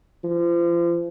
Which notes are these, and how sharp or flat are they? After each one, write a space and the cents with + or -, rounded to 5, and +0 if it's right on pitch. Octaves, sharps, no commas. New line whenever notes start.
F3 -35